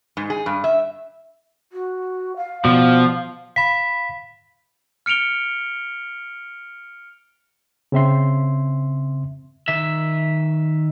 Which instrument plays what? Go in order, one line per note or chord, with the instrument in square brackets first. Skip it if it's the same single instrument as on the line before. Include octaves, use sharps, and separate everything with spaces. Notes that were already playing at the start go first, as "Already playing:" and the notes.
[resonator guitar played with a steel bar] G#2
G#4
G2
E5
[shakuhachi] F#4
F5
[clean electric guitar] B2 D5 [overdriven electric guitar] F3
[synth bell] F5 B5 [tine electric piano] B6
[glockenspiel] F6 C#7 D7 F7 G7
[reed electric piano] C#3 C4 E5 C6
[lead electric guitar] D#3 E5